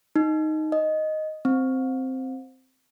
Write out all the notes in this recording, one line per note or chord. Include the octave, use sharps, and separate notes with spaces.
D#4
D#5
C4